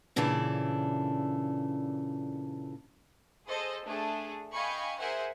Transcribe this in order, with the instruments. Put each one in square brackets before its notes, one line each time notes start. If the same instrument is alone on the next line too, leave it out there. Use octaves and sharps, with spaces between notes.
[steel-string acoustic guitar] A#2 C#3 E3 D4 A4
[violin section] G#4 A4 C5 D#5
A3 D4 G#4 A4
D#5 F5 G5 G#5 B5 C#6
G#4 A#4 C5 E5 F#5 G#5